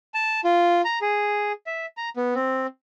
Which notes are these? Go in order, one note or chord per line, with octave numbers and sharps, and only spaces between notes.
A5
F4
A#5
G#4
E5
A#5
B3
C4